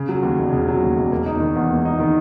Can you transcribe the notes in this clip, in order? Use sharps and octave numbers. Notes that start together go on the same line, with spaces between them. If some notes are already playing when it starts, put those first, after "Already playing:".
Already playing: C#3
F#3
D#2
E1
C#3
F#3
D#2
E1
A#3
D#4
D#3
E2
A#3
D#4
D#3